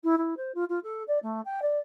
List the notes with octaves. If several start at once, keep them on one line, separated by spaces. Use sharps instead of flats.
E4
E4
C5
F4
F4
A4
D5
A3
G5
D5